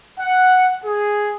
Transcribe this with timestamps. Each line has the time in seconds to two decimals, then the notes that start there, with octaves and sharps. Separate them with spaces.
0.20 F#5
0.84 G#4